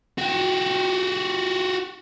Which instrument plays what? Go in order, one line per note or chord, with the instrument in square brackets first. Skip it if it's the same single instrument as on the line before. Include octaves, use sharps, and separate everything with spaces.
[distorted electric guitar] F#4 G4